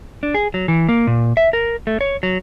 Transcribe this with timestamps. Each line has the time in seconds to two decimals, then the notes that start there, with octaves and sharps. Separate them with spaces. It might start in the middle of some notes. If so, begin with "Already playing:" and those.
0.23 D4
0.34 G#4
0.54 F#3
0.68 E3
0.89 A#3
1.07 A#2
1.37 E5
1.53 A#4
1.87 A3
2.01 C#5
2.23 F#3